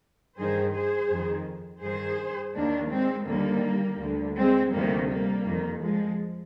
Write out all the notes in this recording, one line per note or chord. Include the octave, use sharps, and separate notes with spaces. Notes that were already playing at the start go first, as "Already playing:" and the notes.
G2 D#3 G#4 C5
G#4 C5
F2 D#3
G2 D#3 G#4 C5
D#2 D#3 A#3 D4
G#3 C4
D#2 D3 G3 A#3
D2 D3
G#3 C4
D2 C3 D#3 G3 A#3
G3 A#3
F2 D#3
F3 G#3